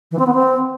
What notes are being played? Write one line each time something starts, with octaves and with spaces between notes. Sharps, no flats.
E3
C4
B3
C4